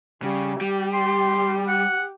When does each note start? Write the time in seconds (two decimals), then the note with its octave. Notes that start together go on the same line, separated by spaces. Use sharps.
0.23 C#3 G3
0.61 G3 G4
0.94 C6
1.68 F#5